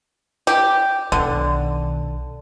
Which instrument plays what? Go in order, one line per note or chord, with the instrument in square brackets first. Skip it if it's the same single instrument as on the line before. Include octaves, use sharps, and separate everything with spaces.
[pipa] G4
[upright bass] B1 D#3 [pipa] D3